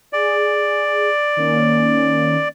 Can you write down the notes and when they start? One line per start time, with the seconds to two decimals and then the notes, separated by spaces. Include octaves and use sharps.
0.13 G#4 D5
1.37 D#3 A#3 C#4